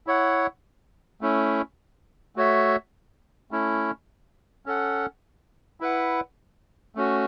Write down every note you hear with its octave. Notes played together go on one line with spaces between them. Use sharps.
E4 C#5 F#5
A3 C#4 E4
A3 F#4 C#5 E5
A3 C#4 E4
C#4 A4 F#5
E4 B4 F#5
A3 C#4 F#4